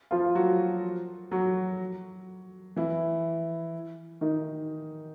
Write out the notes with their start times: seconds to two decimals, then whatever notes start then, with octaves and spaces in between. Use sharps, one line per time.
0.11 F3 F4
0.35 F#3 F#4
1.31 F#3 F#4
2.76 E3 E4
4.21 D#3 D#4